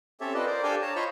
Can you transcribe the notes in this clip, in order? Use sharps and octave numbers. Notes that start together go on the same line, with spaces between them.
C4 C#4 G4 A4 C#5 E5
F4 A4 B4 D5 D#5
A#4 C5 D5
D4 G4 A4 F5 G5 G#5
C#5 A5 A#5
F4 C5 C#5 D#5 B5 C#6